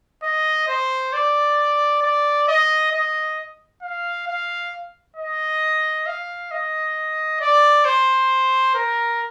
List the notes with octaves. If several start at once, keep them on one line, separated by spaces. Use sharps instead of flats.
D#5
C5
D5
D5
D#5
D#5
F5
F5
D#5
F5
D#5
D5
C5
A#4